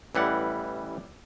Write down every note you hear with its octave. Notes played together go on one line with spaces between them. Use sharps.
A1 E3 G3 F#5